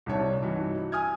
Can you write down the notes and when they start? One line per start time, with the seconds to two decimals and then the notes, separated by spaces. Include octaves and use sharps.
0.06 C2 C3 D4 C#5 A5
0.42 G2 E3 D#4 F#4
0.92 G#5 D#6 F6 G#6